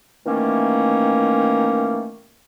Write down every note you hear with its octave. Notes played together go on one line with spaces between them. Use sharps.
D#3 E3 A3 A#3 C#4